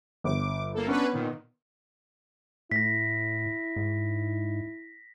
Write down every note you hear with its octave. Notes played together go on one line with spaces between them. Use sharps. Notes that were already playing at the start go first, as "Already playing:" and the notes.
G1 D6
A#3 A4
B3 C#4 D4 B4
A#2 D#3
A2 E4 A#6 B6
G#2